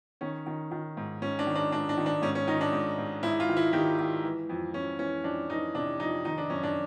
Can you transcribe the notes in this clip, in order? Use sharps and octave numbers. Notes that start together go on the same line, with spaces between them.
D#3 C#4
D#3
D#3
G#2
G#2 C#4
D4
D#3
D4
G#2 D4
D4
D#3
D4
G#2 C#4
C#4
D#3 D#4
D4
G#2
G#2
G#2 E4
F4
D#3
E4
D#3 G4
D#3
E3
F2
F2 C#4
E3 C#4
F2 D4
E3 D#4
C3 D4
F2 D#4
D#3 D#4
D4
F#2 C#4
D4